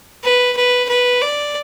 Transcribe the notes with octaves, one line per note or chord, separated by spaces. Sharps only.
B4
B4
B4
D5